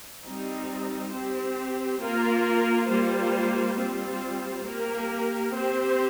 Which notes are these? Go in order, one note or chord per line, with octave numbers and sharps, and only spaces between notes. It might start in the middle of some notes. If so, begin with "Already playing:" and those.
G3 C4 D#4
C4 G4 C5
A#3 F4 A#4
G3 A#3 F4 C5
G3 C4 F4 C5
A#3 G4 A#4
C4 G4 C5